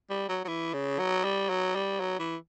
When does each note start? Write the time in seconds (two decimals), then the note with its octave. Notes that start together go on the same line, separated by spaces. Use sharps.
0.10 G3
0.29 F#3
0.45 F#3
0.48 E3
0.74 C#3
0.99 F#3
1.24 G3
1.50 F#3
1.75 G3
2.00 F#3
2.19 E3